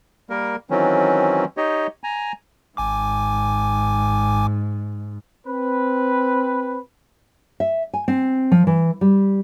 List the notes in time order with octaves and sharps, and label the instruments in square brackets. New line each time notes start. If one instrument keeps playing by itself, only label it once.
[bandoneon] G3 A#3 A#4
D#3 E3 F#3 C4 C#4
D#4 G4 C#5 D#5
G#5 A#5
[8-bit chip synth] G#1 G#5 D6 [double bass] G#2
[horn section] C4 B4
[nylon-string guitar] E5
G#5
C4
F3
E3
G3